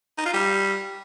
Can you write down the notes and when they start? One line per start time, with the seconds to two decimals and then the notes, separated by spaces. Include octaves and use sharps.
0.18 D#4
0.26 F4
0.33 G3